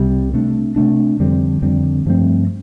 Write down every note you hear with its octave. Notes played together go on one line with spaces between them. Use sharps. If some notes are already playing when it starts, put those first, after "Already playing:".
Already playing: C2 C3 G3
C3 A3 D4
C3 A3 D4
F2 D3 G3 C4
F2 D3 G3 C4
G2 F3 A3 C4